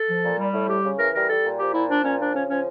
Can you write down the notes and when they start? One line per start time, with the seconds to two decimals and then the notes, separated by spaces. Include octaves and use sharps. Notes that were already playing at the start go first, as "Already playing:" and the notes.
Already playing: A4
0.09 F3
0.24 A#2
0.39 G3
0.53 A2
0.68 G3 G4
0.84 C#3
0.99 E3 A#4
1.14 G3 A#4
1.28 G3 A4
1.44 A#2
1.59 F3 G4
1.74 A#2 E4
1.89 F3 D4
2.04 A#2 C#4
2.19 F3 D4
2.34 C#3 C#4
2.49 F3 C#4